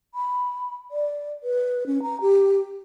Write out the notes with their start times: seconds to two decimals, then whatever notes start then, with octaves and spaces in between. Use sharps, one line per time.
0.15 B5
0.91 D5
1.43 B4
1.87 C#4
2.02 A#5
2.21 G4